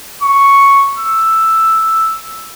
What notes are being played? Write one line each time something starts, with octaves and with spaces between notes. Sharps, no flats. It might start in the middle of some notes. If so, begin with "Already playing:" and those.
C#6
E6